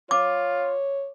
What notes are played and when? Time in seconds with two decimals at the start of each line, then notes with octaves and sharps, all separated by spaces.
0.11 F4 C#5 D6